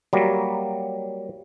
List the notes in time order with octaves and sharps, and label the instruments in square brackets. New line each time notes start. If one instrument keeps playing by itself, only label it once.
[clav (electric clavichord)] F#3 G3 A#3